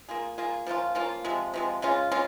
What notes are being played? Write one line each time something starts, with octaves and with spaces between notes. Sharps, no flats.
A#3 F4 G#4
A#3 F4 G#4
F3 A#3 C#4 F4
F3 A#3 C#4 F4
C3 F3 G#3
C3 F3 G#3
C#3 G#3 C#4 F4
C#3 G#3 C#4 F4